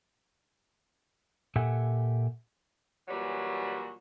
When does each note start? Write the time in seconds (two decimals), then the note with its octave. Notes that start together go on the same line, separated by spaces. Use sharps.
1.56 A#2 G4 A4 E5 F#5 G#5
3.08 A#2 E3 F#3 G3 D4 F#4